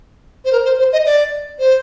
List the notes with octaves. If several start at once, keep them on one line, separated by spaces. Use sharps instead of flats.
C5
A#4
C5
C5
D#5
D5
C5